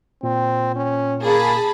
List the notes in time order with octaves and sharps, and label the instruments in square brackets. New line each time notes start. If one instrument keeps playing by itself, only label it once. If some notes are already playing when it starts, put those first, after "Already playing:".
[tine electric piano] A#2 [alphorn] C4
[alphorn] C#4
[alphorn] A#3 [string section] G#4 A5 B5